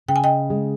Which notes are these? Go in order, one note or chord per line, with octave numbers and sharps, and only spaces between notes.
C#3 G5
G#5
D#5 G5
G#3